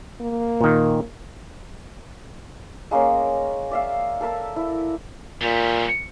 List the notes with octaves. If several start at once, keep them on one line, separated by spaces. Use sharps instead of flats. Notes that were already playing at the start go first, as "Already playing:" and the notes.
A#3
A#2 D#3
G#3 A#3 C#4 A#4
D5 E5 F5
A4 A#4 E5 A5
E4
A#2 F#3 G3